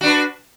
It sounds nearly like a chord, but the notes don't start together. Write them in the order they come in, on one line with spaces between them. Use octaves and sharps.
F#4 D4 B4